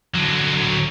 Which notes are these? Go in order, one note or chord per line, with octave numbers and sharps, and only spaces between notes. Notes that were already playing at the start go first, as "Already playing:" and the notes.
D3 F#3